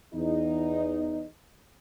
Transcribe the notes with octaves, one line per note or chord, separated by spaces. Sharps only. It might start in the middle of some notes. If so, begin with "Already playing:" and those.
E2 D#4